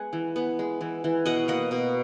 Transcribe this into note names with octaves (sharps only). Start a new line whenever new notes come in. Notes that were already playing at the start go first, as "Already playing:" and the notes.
Already playing: G#3 B3 F#5 G#5
E3
B3
G#3
E3
E3
B2 D#5 F#5
A#3 D#5 F#5
B2